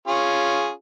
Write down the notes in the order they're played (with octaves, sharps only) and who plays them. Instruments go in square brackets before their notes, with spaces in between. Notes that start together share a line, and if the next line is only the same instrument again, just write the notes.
[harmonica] C#4 F4 G#4